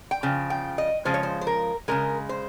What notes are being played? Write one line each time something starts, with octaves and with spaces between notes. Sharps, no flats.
G5
C#3 F3
G5
D#5
C#3 F3 G#3 C5
C#5
C5
C5
A#4
C#3 F3 G#3 A#4
C5